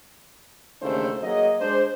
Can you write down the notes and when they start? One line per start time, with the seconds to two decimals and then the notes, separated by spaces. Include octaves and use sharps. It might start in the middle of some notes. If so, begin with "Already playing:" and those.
0.81 D#2 C#3 E3 A3 D4 C5
1.22 F#3 A#3 G#4 D#5
1.61 G#3 D4 C5